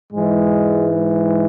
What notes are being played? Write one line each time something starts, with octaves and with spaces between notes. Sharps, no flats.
G#2 E3 G#3